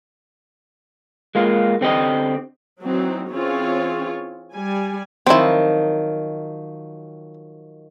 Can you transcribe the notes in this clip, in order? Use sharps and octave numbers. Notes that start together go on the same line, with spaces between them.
G#3 A#3 F4
D3 C4 G4 D#5
E3 F#3 C4 D#4
E3 C4 C#4 F4 G#4 C#5
G3 G#5
D#3 F3 F#3 C4 E4